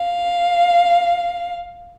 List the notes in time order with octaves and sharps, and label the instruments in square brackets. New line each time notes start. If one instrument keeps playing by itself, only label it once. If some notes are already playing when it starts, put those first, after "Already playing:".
Already playing: [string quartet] F5